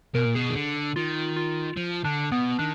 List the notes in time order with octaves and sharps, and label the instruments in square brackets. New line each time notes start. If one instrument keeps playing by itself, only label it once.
[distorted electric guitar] B2 [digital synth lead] A#4
[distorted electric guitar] A#2
[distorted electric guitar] B2 [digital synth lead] G#4
[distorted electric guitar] D#3
D3
[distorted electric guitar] D#3 [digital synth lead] F4
[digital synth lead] F4
[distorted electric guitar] F3
[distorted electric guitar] D3 [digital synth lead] D4
[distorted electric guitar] B2 [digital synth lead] B3
[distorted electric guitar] D#3 [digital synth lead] D4